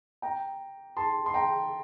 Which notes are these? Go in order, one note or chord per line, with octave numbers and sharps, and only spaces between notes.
G5 A#5
A5 C6
C6
G5 A#5